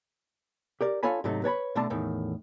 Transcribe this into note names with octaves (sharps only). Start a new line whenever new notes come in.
G4 A#4 D5
D4 F4 A4 C#5 G#5 B5
G#2 C3 F#3 A3 D#4
B4 C#5 A5 B5
B2 D3 A3 D4 A5
E2 A2 D#3